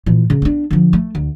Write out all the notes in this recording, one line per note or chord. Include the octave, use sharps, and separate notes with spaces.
A#2 E3
C#3
B3 D4
D3 F3
A3
D2